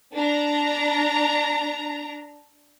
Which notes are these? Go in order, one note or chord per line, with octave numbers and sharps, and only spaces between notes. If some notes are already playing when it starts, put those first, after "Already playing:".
D4 A#5